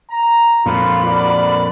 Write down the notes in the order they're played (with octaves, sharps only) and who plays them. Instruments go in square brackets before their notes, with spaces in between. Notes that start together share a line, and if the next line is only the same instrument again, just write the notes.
[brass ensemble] A#5
[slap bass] F2 A#2 [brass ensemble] F4 [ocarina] B5
[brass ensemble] F#4 A#4 D5